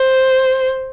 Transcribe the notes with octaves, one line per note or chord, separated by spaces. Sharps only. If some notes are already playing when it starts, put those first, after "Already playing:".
Already playing: C5